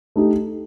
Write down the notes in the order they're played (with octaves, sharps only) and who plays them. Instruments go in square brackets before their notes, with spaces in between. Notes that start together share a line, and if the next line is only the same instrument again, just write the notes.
[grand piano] A3 D#4 G4